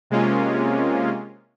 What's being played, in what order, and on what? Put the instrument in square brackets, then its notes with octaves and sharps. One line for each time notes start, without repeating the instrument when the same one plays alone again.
[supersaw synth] C3 G#3 A#3 C#4 F4